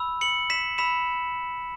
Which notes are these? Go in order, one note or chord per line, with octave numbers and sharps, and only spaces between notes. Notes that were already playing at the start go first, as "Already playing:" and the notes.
Already playing: B5 E6
C#7 F#7
B6 E7
B5 E6 B6 E7